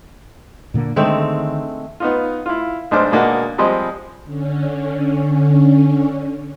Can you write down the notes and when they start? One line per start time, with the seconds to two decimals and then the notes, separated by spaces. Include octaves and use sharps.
0.74 A#2 D3 A#3
0.96 D3 D#3 G#3 A3 C4
2.00 B3 D#4 F4
2.46 E4 F4
2.91 B1 G#3 D4 C5 D6 F6
3.12 B2 G#3 A#3 D4 F#4
3.58 F3 G3 G#3 C4 D#5
4.25 D3 C#4